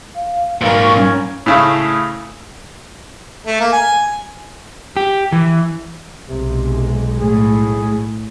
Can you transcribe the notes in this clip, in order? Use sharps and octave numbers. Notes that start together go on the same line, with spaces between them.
F5
G#1 A#2 F#3 A#4 F5
C#6
C#4
A2 C#3 A3
A3
A#3
G#5
G4
E3
B1 C3 G#3
A2 G#4